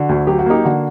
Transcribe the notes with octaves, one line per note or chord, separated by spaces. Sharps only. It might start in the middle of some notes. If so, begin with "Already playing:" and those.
Already playing: D3 F#4
D2
F#3 G4
F#4
A#3 D#4 G4
D3 F#4